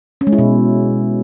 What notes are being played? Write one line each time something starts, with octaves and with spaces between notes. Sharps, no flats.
C#4
G#3
E4
B2